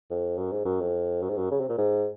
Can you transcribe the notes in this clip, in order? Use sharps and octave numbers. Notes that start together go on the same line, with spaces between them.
F2
F#2
G#2
F#2
F2
F#2
G#2
F#2
C#3
C3
A#2
G#2